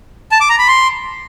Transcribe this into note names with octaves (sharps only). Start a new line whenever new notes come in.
A5
D6
A#5
B5
C6